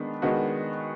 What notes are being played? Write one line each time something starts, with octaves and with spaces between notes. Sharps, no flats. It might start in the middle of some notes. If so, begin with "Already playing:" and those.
Already playing: D#3 G#3 B3 D4
D#3 G#3 B3 D4 F#4